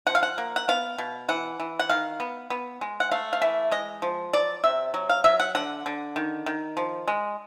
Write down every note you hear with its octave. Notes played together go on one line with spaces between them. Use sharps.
F3 F#5
F5
F#5
A#3
F#5
B3 F5
B2
E3 F#5
E3
F#5
D#3 F5
B3
B3
G#3
F#5
A3 F5
F5
E3 E5
G#3 D#5
F3
F#3 D5
C3 E5
F#3
F5
F#3 E5
F#5
D3 F#5
D3
D#3
D#3
F3
G#3